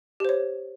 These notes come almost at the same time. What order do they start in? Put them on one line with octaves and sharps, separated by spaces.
G4 C5 C#5